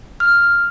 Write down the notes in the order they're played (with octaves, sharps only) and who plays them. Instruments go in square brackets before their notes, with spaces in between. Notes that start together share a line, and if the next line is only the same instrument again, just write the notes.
[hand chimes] F6